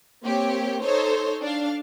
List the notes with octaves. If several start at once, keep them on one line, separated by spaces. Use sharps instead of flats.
A#3 C4 G4 C#5
D#4 A4 C5 C#5
D4 F5